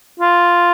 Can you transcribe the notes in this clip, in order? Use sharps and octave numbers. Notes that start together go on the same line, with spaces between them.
F4